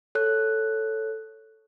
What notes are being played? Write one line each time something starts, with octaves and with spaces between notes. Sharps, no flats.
A4 C#5 F#6